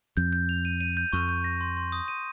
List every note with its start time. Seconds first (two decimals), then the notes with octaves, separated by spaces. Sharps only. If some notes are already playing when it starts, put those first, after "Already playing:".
0.17 F2 G6
0.33 G6
0.49 F7
0.65 D#7
0.81 D#7
0.97 G6
1.13 F2 C#6
1.29 G6
1.44 A#6
1.61 C6
1.77 C6
1.92 D#6
2.08 D#7